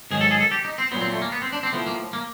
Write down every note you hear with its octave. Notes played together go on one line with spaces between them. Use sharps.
G#2 D#3 F#3 G#4
A4
G#4
A4
G4
D#4
C4
A#2 F#3 B3
C4
A3
A#3
B3
C4
D4
C4
A2 F3 B3
A#3
A#3